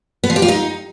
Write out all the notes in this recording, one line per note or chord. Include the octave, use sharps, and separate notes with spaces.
B3
F3
G4
F4
D#4